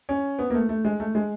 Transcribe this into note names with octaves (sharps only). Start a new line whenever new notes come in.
C#4
B3
A#3
A3
A3
G#3
A3
G#3